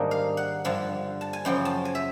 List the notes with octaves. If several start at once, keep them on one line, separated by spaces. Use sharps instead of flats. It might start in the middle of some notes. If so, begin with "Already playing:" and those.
Already playing: G#2 D#3 G3 A#3 D4
F5
F#5
G2 D3 F3
A5
G#5
F#2 C#3 F3 G5
A5
G#5
E5